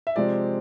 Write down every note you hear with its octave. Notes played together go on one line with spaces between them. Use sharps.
E5
C3 F3 G#3 C4 D5